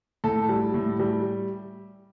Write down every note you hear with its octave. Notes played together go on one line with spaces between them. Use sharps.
A2 A4
G3
A2
G3